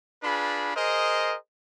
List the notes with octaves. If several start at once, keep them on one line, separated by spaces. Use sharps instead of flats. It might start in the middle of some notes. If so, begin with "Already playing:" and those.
D4 F4 G#4 B4 B5
G#4 A#4 C5 D#5